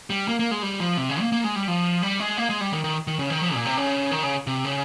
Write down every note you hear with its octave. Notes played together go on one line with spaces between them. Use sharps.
G3
A#3
A#3
G#3
G3
F3
C3
C#3
A#3
A#3
G#3
G3
F3
G3
G#3
A#3
G#3
G3
D#3
D#3
D#3
C#3
D#3
F3
A#2
C3
C#3
D#3
C#3
C3
C#3